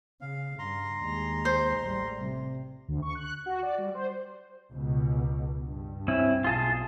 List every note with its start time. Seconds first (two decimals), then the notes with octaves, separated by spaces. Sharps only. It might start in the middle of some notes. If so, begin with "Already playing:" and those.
0.21 C#3 F5
0.59 G2 A#5 C6
1.03 D#2 G#3
1.45 C5
1.79 A1 G3
2.23 C3
2.88 D2
3.02 C#6
3.15 F#6
3.46 F#4
3.63 D5
3.78 G3
3.95 C5
4.73 C#2 B2
5.63 G2
6.08 C4 C#4 E4
6.44 B1 F4 G#4 A5